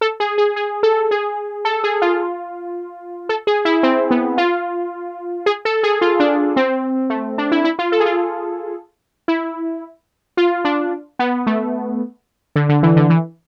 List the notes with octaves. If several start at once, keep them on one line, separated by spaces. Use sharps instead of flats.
A4
G#4
G#4
G#4
A4
G#4
A4
G#4
F4
A4
G#4
E4
C4
B3
F4
G#4
A4
G#4
F4
D4
C4
A3
D4
E4
E4
F4
A4
G#4
F4
E4
F4
D4
B3
A3
D3
D3
E3
D3
E3